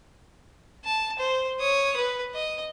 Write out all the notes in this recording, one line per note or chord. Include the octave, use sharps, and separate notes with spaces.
A5
C5
C#5 D#6
B4
D#5